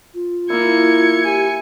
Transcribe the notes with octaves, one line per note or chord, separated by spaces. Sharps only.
F4
A#3 E4 G#6 C#7
G4 G#5